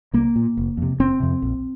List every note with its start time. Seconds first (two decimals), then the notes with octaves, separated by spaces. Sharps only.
0.13 C2 A#3
0.36 A#2
0.57 F1
0.77 F2 C3
0.99 F1 C4
1.20 F2 C3
1.42 A#1